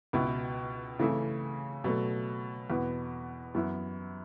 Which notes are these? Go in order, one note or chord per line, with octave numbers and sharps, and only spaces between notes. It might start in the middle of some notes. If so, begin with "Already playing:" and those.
C#2 B2 B3 E4
C#3 E3 A3 E4
B2 F#3 A3
E2 B2 B3
F#2 E3 B3 E4